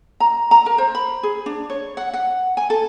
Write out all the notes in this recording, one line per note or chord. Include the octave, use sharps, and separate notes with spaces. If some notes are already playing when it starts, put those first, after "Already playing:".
A#5
A#5
A#4
C5
B5
G#4
D4
C#5
F#5
F#5
G#5
A4